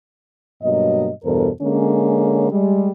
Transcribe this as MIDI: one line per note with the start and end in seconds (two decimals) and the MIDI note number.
0.62 1.09 43
0.62 1.09 47
0.62 1.09 54
0.62 1.09 58
0.62 1.09 75
1.23 1.48 40
1.23 1.48 43
1.23 1.48 47
1.23 1.48 69
1.23 1.48 70
1.23 1.48 72
1.61 2.48 50
1.61 2.48 56
1.61 2.48 58
1.61 2.48 61
2.50 2.90 55
2.50 2.90 56